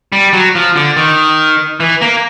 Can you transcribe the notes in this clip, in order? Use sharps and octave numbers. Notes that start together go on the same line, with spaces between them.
G3
F#3
F3
D3
D#3
E3
A#3